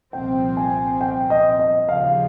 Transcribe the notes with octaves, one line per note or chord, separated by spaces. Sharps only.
C2 A#2 F3 C4 G5
G#5
G5
D#5
D#5
D#2 C#3 F3 F5